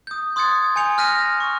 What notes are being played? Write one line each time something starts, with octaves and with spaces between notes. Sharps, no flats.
D#6 G6
C6 D#6 F#6 G#6 A6 C#7
G#5 G6 C#7 F7
F6 F#6 A#6 B6 D#7
C#6